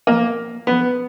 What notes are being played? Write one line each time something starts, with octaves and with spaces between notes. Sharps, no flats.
A#3
B3